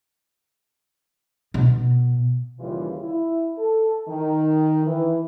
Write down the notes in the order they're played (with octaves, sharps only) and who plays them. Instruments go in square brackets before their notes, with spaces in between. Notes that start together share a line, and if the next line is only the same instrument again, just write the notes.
[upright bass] B2
[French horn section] D#2 C#3 E3 G3 F4
E4
A4
D#3
E3